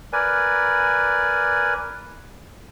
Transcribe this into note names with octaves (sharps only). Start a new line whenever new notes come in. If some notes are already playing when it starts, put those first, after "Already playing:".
A#4 B4 D5 G#5